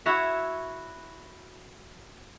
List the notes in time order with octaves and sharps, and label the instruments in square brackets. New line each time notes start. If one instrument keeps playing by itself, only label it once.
[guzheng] E4 F#4 C#5 E5